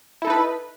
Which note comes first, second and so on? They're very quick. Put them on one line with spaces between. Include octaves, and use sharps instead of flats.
E4 A4 D#4 B4